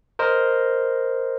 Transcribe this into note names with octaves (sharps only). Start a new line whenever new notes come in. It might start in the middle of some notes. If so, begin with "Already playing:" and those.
A#4 C5 D#5